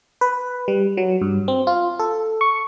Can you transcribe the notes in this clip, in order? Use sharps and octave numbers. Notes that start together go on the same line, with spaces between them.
B4
G3
F#3
G2
C4
F4
A4
C#6